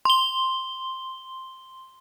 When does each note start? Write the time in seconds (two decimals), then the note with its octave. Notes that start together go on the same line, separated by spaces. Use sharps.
0.05 C6 G7